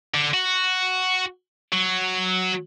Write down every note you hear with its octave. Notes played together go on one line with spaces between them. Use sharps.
D3
F#4
F#3